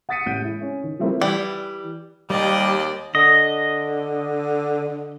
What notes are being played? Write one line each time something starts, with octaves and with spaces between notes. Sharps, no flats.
F#5 D#6 A6 B6 C#7 D#7
A1 G6 D7 D#7
G#3 E4
C#4 C#5
D#3
F3 G3 A3 C4 E4 A#4
E3 G3
D#2 G3 G4 D5 D#5
D3 D#5